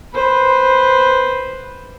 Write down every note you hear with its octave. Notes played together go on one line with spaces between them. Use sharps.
B4 C5